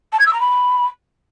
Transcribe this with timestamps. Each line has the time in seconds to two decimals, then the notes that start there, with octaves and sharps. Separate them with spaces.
0.12 A5
0.19 G#6
0.26 E6
0.33 A#5
0.40 B5